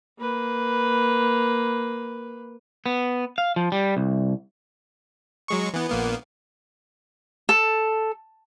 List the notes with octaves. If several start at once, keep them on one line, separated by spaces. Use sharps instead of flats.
A#3 B4
B3
F5
F3
G3
C2
F#3 G#3 C#6
E3 B3
A#1 A#3 B3
A4